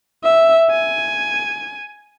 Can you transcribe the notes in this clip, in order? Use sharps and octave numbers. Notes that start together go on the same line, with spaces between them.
E5
G#5